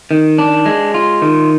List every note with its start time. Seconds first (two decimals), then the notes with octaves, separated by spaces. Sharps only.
0.11 D#3
0.38 D4
0.66 G#3
0.94 F4
1.22 D#3